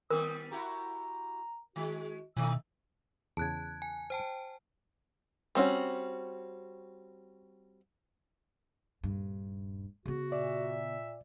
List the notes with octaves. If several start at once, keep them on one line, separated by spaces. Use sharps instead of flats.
D#3 G3 B3 A#4 D#6
E4 F#4 G4 A#5
D#3 G#3 F#4
B2 D#3 A3 D#4 E6
E2 C#3 A5 F#6 G#6
G#5
C5 G5 A5
G3 C4 C#4 F#4
D#1 G2
C#3 B3 F#4
A#2 D5 E5